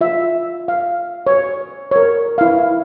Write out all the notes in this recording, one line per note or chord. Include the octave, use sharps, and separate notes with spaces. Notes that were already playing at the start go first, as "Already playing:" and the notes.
F4 E5
F5
C#5
A#4 C#5
E4 F5